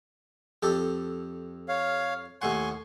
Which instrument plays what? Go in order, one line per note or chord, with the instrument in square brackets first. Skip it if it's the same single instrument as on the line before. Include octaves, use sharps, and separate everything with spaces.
[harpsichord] F2 G4 A4
[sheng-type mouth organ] C#5 F5
[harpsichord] D#2 A2 F#5 [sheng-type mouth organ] G#5 C6 C#6